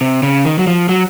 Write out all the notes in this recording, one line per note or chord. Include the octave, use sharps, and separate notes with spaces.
C3
C#3
D#3
F#3
F3
F#3